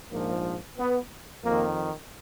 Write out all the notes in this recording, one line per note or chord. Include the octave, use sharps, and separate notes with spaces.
A#1 G#2 F3 A#3
B3
F2 D#3 A#3